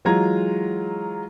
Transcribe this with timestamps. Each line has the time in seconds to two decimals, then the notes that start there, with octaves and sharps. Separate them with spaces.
0.05 E3 F#3 G#3 F4 A#5 G#6